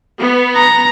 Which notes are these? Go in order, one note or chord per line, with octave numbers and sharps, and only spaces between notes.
B3
A#5